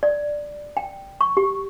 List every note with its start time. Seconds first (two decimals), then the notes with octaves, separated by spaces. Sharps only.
0.03 D5
0.77 G5
1.21 C#6
1.37 G4